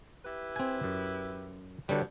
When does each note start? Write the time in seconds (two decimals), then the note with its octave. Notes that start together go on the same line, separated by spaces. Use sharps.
0.25 E4 G4 B4
0.56 C4 G#5
0.83 F#2
1.89 G2 B2 D3 G3 C#5